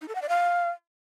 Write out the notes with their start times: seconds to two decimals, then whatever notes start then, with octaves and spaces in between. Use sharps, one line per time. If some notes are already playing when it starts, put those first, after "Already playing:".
0.01 D#4
0.08 A4
0.15 F#5
0.22 D5
0.29 F5